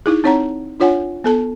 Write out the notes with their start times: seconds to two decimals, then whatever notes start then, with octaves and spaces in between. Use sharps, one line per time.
0.06 D#4 E4 G#4
0.24 C4 D#4 C#5 F#5 A#5
0.80 D4 F4 C#5 F#5 G#5
1.24 B3 A4 A5